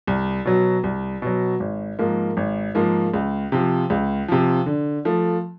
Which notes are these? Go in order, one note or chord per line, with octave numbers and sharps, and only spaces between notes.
C2
B2 F#3
C2
B2 F#3
G#1
G#2 F3 A#3
G#1
G#2 F3 A#3
C#2
C3 F3
C#2
C3 F3
D3
F3 A3